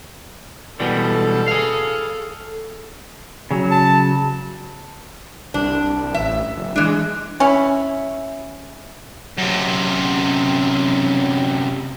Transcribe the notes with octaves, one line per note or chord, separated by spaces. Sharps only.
B2 E3 G3 A4
G#4 F5
C#3 F#3
A5
C2 D4
A1 E5
F#1
E3 G#3 D4
C#4 E4
F#2 C3